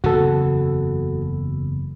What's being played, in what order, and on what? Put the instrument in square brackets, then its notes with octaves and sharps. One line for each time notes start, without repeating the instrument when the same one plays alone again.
[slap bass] F#1 E2 C#3 [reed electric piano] F#4 A4